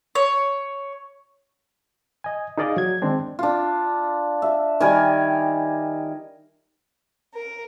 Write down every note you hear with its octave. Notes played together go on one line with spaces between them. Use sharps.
C#5
D#5 G#5
D#4 G#4 A#4 D5 D#5 F5
F#3 G#6
D#3 G#3 C4 D4
D4 F4
E5
D#3 G3 A#4 G#5
A#4